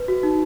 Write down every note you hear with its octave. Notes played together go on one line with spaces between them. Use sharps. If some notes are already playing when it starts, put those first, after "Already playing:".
Already playing: B4
F#4
D#4